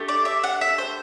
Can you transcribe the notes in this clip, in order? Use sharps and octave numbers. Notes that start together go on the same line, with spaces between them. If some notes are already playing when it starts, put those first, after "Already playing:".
Already playing: A3 D4 G4
D5
E5
F#5
E5
C5